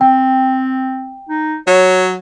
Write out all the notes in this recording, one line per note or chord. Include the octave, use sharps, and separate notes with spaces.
C4 G5
D#4
F#3 C#5